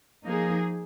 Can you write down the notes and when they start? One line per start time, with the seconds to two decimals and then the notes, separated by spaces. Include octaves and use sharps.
0.25 F3 A#3 D#4 G#4